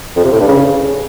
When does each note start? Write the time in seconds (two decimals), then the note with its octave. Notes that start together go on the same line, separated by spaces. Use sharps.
0.16 F2
0.24 C3
0.32 A2
0.40 G2
0.48 C#3